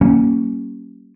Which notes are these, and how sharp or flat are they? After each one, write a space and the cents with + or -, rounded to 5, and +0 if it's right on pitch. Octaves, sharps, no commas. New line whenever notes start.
G3 -45 A#3 +0 C#4 +0